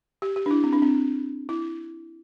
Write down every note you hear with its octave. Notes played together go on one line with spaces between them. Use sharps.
G4
G4
D4
E4
C4
D4
C4
E4